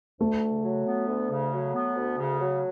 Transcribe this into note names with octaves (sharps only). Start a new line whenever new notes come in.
D2 A3
C#3
F#3
B3
D2
C#3
F#3
B3
D2
C#3
F#3